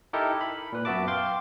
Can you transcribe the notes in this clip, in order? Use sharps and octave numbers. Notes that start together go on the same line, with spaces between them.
D#4 E4 G4 A4 A#4
B5
A#2 B4
F#2 B3 F#4 E5 A5 D6
F5 G5 C6 D6